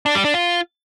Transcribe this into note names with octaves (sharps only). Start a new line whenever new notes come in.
D4
G3
D4
F4